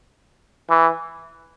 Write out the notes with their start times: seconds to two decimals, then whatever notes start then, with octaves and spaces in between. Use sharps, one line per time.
0.70 E3